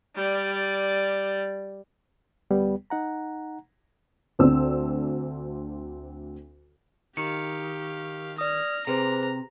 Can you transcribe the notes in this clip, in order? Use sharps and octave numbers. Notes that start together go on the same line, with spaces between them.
G3 D5
D2 G3 B3
D#4 F#5 A#5
D2 C4 D4 E6
D#3 G4 F5 C#7
D5 D#6 F6 A#6
C3 G#4 B4 C5 A#5